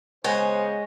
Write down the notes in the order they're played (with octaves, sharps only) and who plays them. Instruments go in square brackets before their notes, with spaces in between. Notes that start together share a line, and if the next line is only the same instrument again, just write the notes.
[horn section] C#3 B3 [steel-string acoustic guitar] G#3 [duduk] C5 [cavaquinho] C#5 F#5